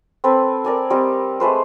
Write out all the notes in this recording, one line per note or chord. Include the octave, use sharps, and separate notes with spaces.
C4 A4 B4
A#4 D5 G#5
G3 C4 D#5
G#3 A3 B4 C5